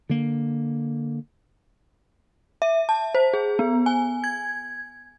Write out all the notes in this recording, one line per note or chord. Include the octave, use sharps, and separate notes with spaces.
D3 A#3
E5
A5
C5
G#4
B3
G#5
G#6